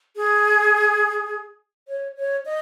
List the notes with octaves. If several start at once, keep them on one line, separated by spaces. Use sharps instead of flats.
G#4
C#5
C#5
D#5